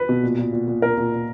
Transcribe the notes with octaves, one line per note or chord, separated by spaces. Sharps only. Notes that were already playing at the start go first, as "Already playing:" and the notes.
Already playing: B4
B2
A#2
A#2
A#2
A#2
A#2 A#4
A#2
A#2